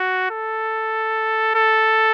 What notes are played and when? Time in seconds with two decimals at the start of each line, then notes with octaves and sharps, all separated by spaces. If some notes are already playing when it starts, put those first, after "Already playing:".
Already playing: F#4
0.31 A4
1.55 A4